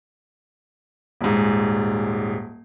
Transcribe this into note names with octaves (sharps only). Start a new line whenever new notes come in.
D#1 G#2